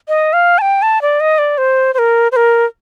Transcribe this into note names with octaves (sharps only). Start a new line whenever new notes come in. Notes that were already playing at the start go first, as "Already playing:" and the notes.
D#5
F5
A5
G5
A5
D5
D#5
D5
C5
C5
A#4
C5
A#4